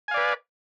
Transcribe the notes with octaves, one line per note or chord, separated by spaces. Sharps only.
B4 D5 F5 G#5